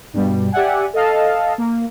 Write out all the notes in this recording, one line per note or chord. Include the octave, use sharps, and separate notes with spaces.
G2 B2 G3
G4 D5 E5 F#5 G#5
A4 D#5 F5 A5
A#3